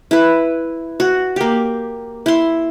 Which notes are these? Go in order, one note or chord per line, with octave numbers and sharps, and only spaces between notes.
E4 B4
F#4
A#3 G4
E4 C6